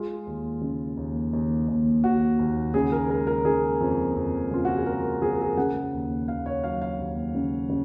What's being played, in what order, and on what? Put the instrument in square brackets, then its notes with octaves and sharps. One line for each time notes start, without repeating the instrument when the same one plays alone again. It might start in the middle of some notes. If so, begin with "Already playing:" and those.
Already playing: [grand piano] G#3 F4
D#2
C#3
D#2
D#2
D#2
D#2 F#4
D#2
C#3 G#4
A#4
G#3 A#4
A#4
C#3 G#4
F2
F2
C#3 F4
F#4
G#4
G#3 A#4
F2 G#4
A#4
G#4
C#3 F#5
D#2
D#2 F5
C#5
F#3 F5
F5
D#2
C#3
C#3